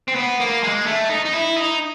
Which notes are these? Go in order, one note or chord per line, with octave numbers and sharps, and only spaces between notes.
C4
B3
A#3
G#3
A3
D#4
D#4
E4
D#4